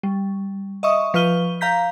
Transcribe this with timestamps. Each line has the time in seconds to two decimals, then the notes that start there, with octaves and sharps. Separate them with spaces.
0.03 G3
0.83 D#5 E5 C#6 D#6
1.14 F3 B4 C#6 F6 D#7 G7
1.61 F5 A#5 G6 B6